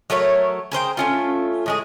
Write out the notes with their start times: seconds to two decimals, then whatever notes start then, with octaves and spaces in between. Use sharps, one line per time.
0.10 F#3 A3 A#4 C#5
0.72 G#4 A#4 C5 G5
0.97 A3 C#4 F4
1.66 A2 G#3 G#4